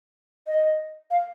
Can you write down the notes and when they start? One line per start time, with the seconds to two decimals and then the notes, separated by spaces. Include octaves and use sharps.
0.47 D#5
1.10 F5